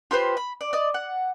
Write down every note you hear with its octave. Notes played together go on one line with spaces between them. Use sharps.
F4 G4 B4 C5
B5
D5
D5 D#5
F#5